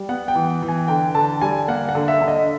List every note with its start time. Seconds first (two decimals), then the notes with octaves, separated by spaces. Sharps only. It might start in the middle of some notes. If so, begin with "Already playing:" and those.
Already playing: G3
0.09 B3 F#5
0.28 G5
0.35 E3
0.62 E3
0.68 G#5
0.88 D3 G5
1.15 D3 A5
1.41 G3 G#5
1.68 A#3 F#5
1.89 F#5
1.95 D3
2.08 E5
2.21 D3
2.28 D#5